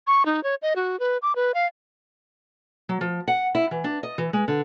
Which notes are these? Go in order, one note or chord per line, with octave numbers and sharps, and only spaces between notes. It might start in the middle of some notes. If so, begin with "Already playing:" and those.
C#6
D#4
C#5
D#5
F#4
B4
D6
B4
F5
F#3
F3
F#5
E4
E3
D4
D#5
E3
G#3
D3